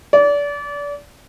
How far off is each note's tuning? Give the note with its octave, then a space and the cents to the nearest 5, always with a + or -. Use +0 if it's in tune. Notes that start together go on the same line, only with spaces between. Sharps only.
D5 -30